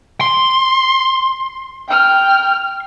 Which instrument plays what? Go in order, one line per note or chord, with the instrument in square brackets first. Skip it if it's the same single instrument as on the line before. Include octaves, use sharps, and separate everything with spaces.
[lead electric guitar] C6
[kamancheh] G5 F6